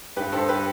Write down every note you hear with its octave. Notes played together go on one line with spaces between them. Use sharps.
G2 G4 B4
G2 A4 C5
G4 B4